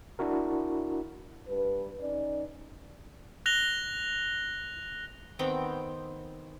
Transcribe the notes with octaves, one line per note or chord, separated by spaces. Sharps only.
D4 E4 F#4 A#4
G2 B4
C#4 D#4 D5
F#6 A#6 F7 G7
D#3 B3 C4 G5